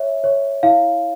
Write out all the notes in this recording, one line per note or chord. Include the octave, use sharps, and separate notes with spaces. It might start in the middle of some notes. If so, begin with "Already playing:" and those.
Already playing: C#5 E5
C#5
E4 F5